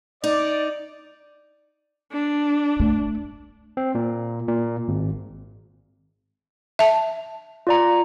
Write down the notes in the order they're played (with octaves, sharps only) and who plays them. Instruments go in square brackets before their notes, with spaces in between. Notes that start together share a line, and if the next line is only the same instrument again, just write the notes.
[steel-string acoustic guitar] D#4 [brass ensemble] D5
[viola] D4
[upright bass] A3
[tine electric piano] C4
A#2
A#2
G#1
[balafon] E5 A5
[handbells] F4 D5 A#5